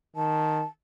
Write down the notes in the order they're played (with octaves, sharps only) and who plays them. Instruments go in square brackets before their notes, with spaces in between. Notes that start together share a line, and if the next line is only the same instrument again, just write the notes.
[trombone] D#3 [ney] A5